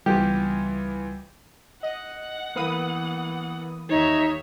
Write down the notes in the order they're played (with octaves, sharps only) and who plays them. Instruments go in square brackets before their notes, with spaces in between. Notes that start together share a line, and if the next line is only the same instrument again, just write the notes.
[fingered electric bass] C#2 G3 [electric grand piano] E3 B3 F4 [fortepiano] G4
[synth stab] D#5 [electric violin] F#5
[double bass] E3 B3 [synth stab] A#3 B4 D#6
[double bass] D#2 [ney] D#4 [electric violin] C#5 E5